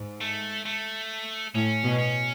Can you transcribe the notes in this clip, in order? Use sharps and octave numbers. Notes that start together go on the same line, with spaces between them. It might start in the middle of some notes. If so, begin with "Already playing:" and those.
Already playing: G#2
A3
A3
A2 C#4
B2
C#4